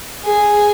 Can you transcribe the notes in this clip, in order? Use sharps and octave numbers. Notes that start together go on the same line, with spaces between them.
G#4